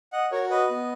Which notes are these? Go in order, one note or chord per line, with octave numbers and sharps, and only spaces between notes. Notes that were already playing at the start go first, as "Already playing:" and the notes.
D#5 F#5
F#4 A#4 C#5
B4 D#5
B3